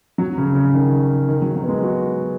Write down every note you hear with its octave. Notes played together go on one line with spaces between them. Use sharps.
F#3
C#3
C#3
D#3
D#3
F#3
F#3
B3
G#3
F#4